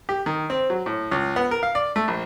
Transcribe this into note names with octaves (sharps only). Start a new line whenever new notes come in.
G4
D#3
C4
F#3
A2
C#2
B3
A#4
F5
D5
A3
A#1